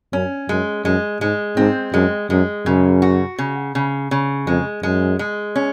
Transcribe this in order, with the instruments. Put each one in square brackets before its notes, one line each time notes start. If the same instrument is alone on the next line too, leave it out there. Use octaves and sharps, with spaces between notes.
[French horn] F#2 [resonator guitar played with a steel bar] C#4
[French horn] F#2 [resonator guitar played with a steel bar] G#3
[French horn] F#2 [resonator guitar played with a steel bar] G#3
[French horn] G#2 [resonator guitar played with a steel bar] G#3
[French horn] G#2 [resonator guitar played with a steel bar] C4
[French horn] F#2 [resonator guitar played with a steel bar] G#3
[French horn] F#2 [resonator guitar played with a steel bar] G#3
[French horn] F#2 [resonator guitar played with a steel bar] C#3
[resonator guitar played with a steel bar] F#4
C#3
C#3
C#3
[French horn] F2 [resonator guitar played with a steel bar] G#3
[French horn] F#2 [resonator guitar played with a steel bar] G#3
[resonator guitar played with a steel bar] G#3
C#4